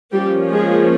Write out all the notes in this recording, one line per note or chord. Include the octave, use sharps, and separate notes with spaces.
F3 G3 A#3 C#4 G4
G#3 G#4